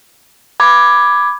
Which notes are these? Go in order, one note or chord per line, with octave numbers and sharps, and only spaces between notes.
B5 D6 G#6